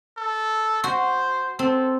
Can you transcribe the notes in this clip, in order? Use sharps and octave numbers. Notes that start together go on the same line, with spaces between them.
A4
F#4 C5
C4 A4